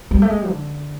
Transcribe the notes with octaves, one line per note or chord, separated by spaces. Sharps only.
G3
A3
G#3
D3